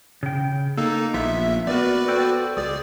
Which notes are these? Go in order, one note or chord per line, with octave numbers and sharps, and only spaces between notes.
C#3 G5
A#3 D#4 A4
A#1 A#3 B3 F4 E5
B3 F#4 A#4 B4 D5
A4 C5 G5
C#2 G#4 D5